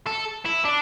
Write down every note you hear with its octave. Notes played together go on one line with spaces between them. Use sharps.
A4
E4
D4